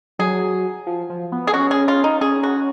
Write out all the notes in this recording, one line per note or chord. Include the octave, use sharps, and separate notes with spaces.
F#3 G#4
F3
F3
B3
G#4
C#4 F#4
G#4
F4
D#4
C#4 G#4
F#4